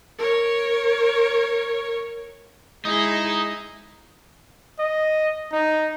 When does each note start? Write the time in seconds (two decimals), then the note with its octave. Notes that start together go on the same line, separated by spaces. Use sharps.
0.18 A#4 C#5
2.85 G#3 D#4 E4 G#4
4.79 D#5
5.53 D#4